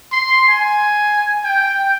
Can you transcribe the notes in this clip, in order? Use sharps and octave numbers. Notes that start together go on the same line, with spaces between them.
C6
G#5
G5